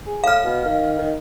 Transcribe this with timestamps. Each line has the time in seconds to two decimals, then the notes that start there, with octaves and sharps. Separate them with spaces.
0.07 G#4
0.24 A2 F5 F6
0.44 B2
0.65 D#3
0.98 D#3